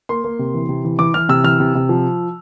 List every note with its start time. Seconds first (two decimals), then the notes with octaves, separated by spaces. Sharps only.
0.09 A#3 C6
0.24 A#3
0.39 C3
0.54 E3
0.69 C3
0.85 E3
0.99 E3 D6
1.14 E3 F6
1.29 C3 E6
1.44 E3 F6
1.60 C3
1.75 C3
1.89 F3